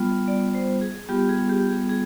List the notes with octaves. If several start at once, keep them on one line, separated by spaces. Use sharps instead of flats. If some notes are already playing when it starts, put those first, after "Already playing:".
Already playing: G3 B3 F4
D5
C5
G#4
G3 B3 F4 G4
G#4
G4
G#4
G#4